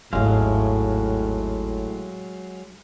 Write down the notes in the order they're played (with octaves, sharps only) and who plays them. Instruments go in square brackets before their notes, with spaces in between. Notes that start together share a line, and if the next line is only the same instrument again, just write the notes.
[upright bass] G#1 D#2 [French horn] A2 [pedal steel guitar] F#3 G#3 F5